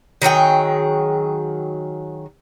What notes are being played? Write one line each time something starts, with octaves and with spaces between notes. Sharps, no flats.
D#3 F#3 G#4 G5